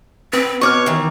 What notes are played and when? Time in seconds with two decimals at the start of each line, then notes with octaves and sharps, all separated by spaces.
0.33 C4 B4
0.61 B2 B4 C#5 C#6 D6 F6
0.86 D#3 E3